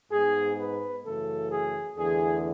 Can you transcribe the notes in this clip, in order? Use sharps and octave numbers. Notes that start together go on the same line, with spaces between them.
G#2 G#3 B3 G#4
B4
F#2 C#3 E3 A3 A4
G#4
E2 D3 A3 G#4